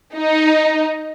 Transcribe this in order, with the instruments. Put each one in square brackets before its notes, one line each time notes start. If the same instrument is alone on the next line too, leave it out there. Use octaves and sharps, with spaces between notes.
[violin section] D#4